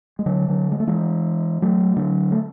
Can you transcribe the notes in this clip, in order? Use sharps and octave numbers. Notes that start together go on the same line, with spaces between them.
G#3
D3 F#3
D3 F#3
G#3
A3
E3 G#3
F#3 A3
D3 F#3
A3